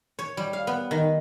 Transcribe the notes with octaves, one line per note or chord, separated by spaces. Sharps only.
C#5
G3
F5
B3
D#3